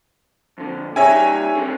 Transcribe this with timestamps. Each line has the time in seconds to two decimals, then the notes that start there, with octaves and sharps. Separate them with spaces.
0.58 F2 D3
0.96 G3 D#4 C#5 E5 G5 G#5
1.55 C4 D4 G#4